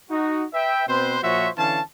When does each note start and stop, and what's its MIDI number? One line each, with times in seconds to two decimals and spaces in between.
0.11 0.46 63
0.11 0.46 66
0.53 0.86 71
0.53 0.86 76
0.53 0.86 79
0.87 1.18 47
0.87 1.18 60
0.87 1.18 71
0.87 1.18 72
1.22 1.49 46
1.22 1.49 53
1.22 1.49 66
1.22 1.49 72
1.22 1.49 73
1.22 1.49 76
1.57 1.80 50
1.57 1.80 52
1.57 1.80 61
1.57 1.80 77
1.57 1.80 81